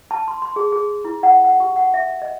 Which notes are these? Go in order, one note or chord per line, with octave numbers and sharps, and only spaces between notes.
A5
C6
C6
G#4
G#4
E4
F#5
F#5
G4
F#5
E5
D#5